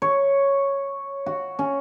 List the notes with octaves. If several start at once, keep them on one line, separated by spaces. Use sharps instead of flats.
C#5
F#4
C#4